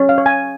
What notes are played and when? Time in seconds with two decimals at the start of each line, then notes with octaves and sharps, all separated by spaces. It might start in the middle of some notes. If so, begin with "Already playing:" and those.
Already playing: C#4
0.09 F5
0.18 C#5
0.26 G#5